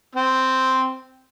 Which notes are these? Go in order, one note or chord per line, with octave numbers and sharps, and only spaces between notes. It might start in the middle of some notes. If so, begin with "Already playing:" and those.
C4